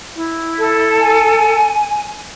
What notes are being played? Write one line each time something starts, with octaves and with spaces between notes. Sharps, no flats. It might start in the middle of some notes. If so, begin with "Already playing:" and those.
E4
A4
G#5